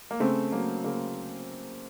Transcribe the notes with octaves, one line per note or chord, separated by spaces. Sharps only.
A#3
C#3 A3 C4
F#3 A3 A#3
C#3 A#3